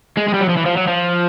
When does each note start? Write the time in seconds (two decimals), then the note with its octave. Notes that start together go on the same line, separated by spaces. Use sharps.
0.17 G#3
0.28 G#3
0.34 G3
0.41 F#3
0.49 F3
0.57 E3
0.66 F3
0.77 F#3
0.88 F3